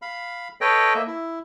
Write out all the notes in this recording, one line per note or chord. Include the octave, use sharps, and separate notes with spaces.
F5 B5
A4 B4 C#5 D#5 G5
A#3 E5
E4